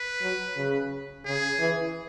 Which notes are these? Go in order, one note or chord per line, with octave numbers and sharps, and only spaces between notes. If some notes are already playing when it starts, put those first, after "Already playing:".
Already playing: B4
F#3
C#3
C#3 G#4
E3